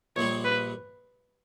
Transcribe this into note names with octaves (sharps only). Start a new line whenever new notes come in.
A#1 A#2 G3 C#5
B4